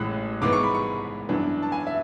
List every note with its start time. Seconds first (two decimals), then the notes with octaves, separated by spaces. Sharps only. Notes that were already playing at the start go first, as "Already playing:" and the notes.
Already playing: A1 A2 G#3 F#6
0.42 G#2 E3 G#3 B3 D6
0.53 C#6
0.63 B5
0.75 C#6
1.29 F#2 E3 B3 D4
1.62 A5
1.72 G#5
1.87 E5